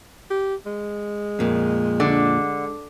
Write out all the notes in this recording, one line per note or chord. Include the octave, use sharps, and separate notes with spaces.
G4
G#3
F2 A#2
D3